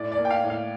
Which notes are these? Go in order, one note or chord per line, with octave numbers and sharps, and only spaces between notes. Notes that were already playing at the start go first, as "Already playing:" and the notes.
Already playing: A2 D5
D5
A#3
G5
F5
A2
F5